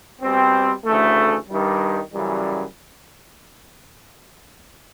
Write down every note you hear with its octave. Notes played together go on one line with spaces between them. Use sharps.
B2 G3 C4
D2 C#3 E3 A3
G2 D#3 G3
F#2 C#3 E3 G3